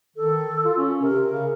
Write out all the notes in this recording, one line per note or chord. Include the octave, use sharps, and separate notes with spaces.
D#3 A4
F4
C#4
C3 A#4
C#3